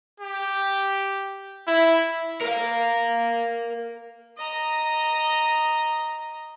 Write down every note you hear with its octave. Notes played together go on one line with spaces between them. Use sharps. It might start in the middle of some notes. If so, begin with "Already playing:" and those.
G4
E4
A#4 F5
D#5 A#5